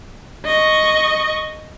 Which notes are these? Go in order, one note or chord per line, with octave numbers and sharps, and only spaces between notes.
D#5 C#6